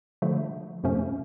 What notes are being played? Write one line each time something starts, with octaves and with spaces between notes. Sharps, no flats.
D3 F3 A3
F2 C3 F3 A3 C#4